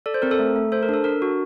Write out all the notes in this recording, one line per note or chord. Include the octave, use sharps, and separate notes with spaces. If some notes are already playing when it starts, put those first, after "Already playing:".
A4 D5
C5
C4 A#4
A4
A3
A3
A4 C5
A#4
D4 A4
D4 A#4
F#4